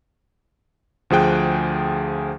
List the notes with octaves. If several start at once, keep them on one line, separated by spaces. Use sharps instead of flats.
D2 F3 G#4 G5 F#6